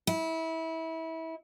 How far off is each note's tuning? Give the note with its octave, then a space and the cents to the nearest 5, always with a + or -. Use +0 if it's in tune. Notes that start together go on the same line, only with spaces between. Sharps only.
E4 -25